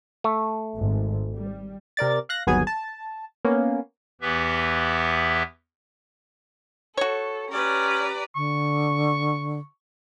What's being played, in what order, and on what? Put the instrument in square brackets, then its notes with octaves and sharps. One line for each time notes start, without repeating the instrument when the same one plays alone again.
[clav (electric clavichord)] A3
[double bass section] G#1
G3
[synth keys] C3 A#4 D5 A6
F5 F#6 A#6
G1 D#2 F#3 B3 G#4 G#5
A5
A#3 B3 C#4
[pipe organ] E2 E3 B3 G4 B4 E5
[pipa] F#4 C#5 [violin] A4
[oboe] C#4 [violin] G4 A#5 [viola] B4 D5
[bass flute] D3 [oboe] C#6